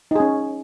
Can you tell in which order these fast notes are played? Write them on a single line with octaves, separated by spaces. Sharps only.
D#4 G#4 C#4